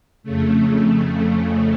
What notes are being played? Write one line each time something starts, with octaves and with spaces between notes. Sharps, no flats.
F2 C#3 A3